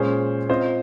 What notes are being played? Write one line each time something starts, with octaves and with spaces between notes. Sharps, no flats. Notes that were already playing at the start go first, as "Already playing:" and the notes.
Already playing: A#2 G#3 C#4 G#4 C5
C4 F4 C5 D#5